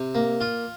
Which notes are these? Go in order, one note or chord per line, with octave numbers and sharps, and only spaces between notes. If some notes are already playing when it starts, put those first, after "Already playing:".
Already playing: C3
A#3
F4